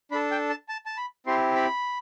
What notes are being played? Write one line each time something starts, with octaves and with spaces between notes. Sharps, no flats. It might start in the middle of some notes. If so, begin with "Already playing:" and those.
D4 A4 B5
G5
A5
A5
A5
B5
C4 E4 G4 C6
B5